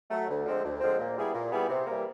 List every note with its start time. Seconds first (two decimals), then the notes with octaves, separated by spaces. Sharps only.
0.10 F#3 A3
0.28 D2
0.45 D3 F3 G#3 C4
0.63 D2
0.81 D3 F3 G#3 C4
0.98 A#2
1.16 G3 B3 E4 G#4
1.34 A#2
1.52 G3 B3 E4 G#4
1.69 C3
1.87 E3 G3 A#3